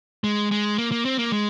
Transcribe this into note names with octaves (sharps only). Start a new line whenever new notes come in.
G#3
G#3
A#3
A#3
C4
A#3
G#3